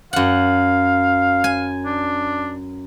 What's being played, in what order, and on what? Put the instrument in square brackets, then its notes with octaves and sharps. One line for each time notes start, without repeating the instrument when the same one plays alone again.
[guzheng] F#2 F#5 [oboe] F5
[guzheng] G#5
[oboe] D4